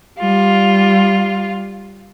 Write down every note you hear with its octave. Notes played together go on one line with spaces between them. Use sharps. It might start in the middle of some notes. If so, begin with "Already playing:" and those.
G3 F4